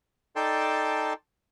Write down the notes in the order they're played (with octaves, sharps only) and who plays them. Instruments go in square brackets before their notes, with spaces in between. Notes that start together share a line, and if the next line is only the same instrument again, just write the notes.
[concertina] D#4 A4 D5 G5 A5 C6